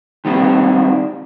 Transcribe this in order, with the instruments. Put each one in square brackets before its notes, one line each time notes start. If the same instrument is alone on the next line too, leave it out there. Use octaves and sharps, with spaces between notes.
[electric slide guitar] D#3 G3 C4 D4